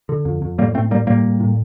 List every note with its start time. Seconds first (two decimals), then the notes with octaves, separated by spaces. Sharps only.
0.09 D3
0.25 F2
0.42 F2
0.58 A2 G3 A#3
0.74 A2 A3 C4
0.91 A2 G3 A#3
1.07 A2 G3 A#3
1.24 A2
1.40 A2